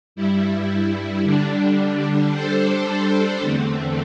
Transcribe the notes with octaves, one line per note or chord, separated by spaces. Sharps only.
G2 G3 E4
D3 G3 D4
G3 D4 A4 C5
E2 D3 A3 C4